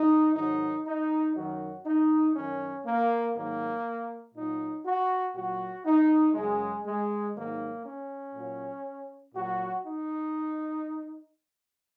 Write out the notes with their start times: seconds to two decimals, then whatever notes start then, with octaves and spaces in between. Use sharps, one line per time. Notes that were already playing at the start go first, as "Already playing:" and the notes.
Already playing: D#4
0.36 G#2 D#3 F#3 D#4
0.85 D#4
1.35 F#2 D#3 F#3 F#4
1.86 D#4
2.35 F#2 D#3 F#3 C#4
2.85 A#3
3.35 G#2 D#3 F#3 A#3
4.35 A#2 F#3 D#4
4.85 F#4
5.35 A#2 F#3 F#4
5.85 D#4
6.34 F#2 C#3 F#3 G#3
6.85 G#3
7.35 G#2 D#3 F#3 A#3
7.85 C#4
8.34 A#2 F#3
9.34 A#2 F#3 F#4
9.84 D#4